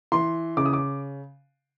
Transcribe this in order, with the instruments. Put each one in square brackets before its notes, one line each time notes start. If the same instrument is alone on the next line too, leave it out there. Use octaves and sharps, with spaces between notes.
[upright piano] E3 C6
C#3 D6
D#6
D6